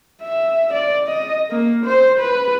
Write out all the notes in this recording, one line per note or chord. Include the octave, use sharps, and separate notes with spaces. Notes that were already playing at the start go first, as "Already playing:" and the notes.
E5
D5
D#5
A#3
C5
B4